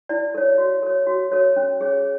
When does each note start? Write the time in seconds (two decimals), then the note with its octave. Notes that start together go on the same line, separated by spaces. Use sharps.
0.09 E4 D5
0.35 A4 C#5
0.58 F#4
0.83 A4 C#5
1.07 F#4
1.32 A4 C#5
1.56 C#4
1.81 G#4 C#5